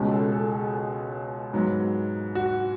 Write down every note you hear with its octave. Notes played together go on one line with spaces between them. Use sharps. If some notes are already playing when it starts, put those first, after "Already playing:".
Already playing: C#2 B2 G#3 C#4
A4
A4
G#4
G#2 F#3 B3
F#4